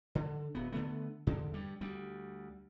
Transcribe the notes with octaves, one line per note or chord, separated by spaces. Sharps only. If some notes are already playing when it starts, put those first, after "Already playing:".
D3
D1 B3
D3 F3 A3 B3
E2 D3
G2 G3
D2 G3